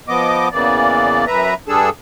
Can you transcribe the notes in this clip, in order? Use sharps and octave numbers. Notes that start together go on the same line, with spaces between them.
F3 B3 D#5 D6
E2 C#3 E3 A#3 D5
F#2 B4 E5 A#5
G2 G3 D4 G#4 A4 E6